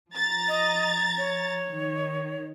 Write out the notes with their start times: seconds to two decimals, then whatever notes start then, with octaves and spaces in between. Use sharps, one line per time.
0.11 F3 A#5 A6
0.48 D#5
1.18 C#5
1.67 D#3